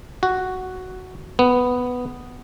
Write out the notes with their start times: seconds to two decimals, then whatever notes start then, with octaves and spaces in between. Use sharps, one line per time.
0.23 F#4
1.39 B3